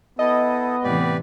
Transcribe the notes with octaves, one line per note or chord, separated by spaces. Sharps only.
B3 E4 A4 D#5
A2 C3 E3 G4 B4 D5